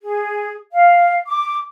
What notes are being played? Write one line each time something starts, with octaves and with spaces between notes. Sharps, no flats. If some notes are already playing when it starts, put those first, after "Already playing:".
G#4
F5
D6